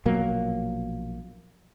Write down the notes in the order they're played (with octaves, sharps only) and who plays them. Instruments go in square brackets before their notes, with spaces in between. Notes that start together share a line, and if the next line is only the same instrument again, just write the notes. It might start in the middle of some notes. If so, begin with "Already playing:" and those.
[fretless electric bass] A#1 B2 F#3 A#3